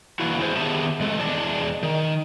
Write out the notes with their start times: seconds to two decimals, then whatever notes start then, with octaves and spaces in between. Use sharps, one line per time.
0.20 E3 A#3 D4 E4 F#4
0.38 E2 E4 G#4 C5
0.56 D#3 B3 G4 G#4 E5 A5
1.00 F2 G#3 A3 A4
1.19 E2 G#3 D4 D5 D#5 A5
1.83 D#3